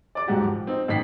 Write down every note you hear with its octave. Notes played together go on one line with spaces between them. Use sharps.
D5 D6
D#1 G#2 F#3 F#4 G4
F3
C4 D#4
A1 D#3 B6 C7